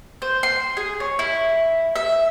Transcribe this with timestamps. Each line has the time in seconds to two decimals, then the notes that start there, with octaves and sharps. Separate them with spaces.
0.22 C5
0.43 C6
0.77 G#4
1.00 C#5
1.19 E4
1.96 E5